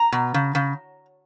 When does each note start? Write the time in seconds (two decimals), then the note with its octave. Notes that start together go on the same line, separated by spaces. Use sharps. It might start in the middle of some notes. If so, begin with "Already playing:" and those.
Already playing: A#5
0.12 B2
0.34 C#3
0.55 C#3